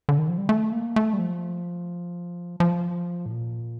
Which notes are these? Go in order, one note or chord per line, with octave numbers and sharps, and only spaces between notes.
D3
D#3
F3
G3
A3
A#3
A3
G3
F3
F3
A2
A#2